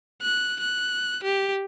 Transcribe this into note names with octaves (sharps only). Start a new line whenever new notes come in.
F#6
F#6
G4